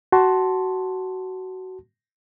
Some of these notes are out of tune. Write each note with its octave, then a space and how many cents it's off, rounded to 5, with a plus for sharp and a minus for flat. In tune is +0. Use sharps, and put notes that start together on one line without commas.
F#4 +15 A5 +0 C6 +5